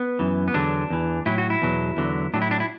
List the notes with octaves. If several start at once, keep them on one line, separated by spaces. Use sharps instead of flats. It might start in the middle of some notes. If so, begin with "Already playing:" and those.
Already playing: B3
F#2 E3
B3
E2 D3 F#3 D4
E2 E3
A2 F#3 E4
F#4
E4
E2 B2 F#3
E2 D3 F#3
A2 F#3 D4
E4
D4
E4